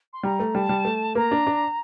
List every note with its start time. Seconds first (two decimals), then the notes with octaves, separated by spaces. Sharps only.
0.13 C6
0.23 G3 A#5
0.39 A3
0.55 G3 A5
0.69 G3
0.85 A3
1.15 A#3 A#5
1.31 D4
1.47 D4